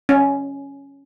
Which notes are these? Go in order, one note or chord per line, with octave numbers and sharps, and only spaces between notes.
C#4